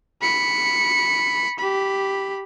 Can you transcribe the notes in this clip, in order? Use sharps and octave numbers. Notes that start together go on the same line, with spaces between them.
B5 C#7
G4 B5